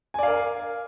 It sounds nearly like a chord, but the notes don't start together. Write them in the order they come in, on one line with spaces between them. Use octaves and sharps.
G#5 D5 F5 A#4